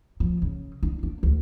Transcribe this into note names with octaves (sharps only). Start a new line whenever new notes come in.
F3
C#3
D4
D4
D2